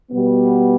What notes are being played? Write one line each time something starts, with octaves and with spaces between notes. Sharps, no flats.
B2 G3 B3